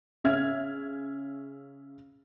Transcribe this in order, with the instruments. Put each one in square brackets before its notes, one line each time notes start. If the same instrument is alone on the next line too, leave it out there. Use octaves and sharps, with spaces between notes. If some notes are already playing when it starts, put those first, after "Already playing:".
[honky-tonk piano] C#3 C#4 E5 F6 G#6